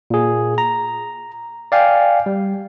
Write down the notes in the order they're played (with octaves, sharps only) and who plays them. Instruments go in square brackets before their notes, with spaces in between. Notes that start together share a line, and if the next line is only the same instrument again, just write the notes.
[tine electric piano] A#2 G#4
A#5
D5 F5 G5 G#5
G3